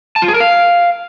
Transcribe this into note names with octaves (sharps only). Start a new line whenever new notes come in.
A5
F4
G#4
A#4
F5